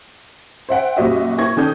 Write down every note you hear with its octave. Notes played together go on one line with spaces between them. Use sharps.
C5 E5 F#5 G5
F#2 A#2 G3 F#4 D#5 E5
A#3 E4 C#6 G#6 A#6
D#3 C#4 A4 D5 D#6 G6